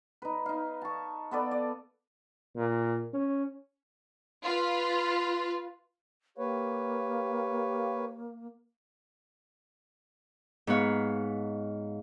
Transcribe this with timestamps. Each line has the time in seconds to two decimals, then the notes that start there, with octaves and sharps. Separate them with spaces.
0.22 D#4 B4
0.46 D#4 F5
0.82 A5 C#6
1.31 B3 A4 B4 D5
1.51 D5
2.56 A#2
3.13 C#4
4.44 F4 B4
6.38 A#3 G4 B4 C#5 F5
10.67 G#2 B3 B4 C#5 F5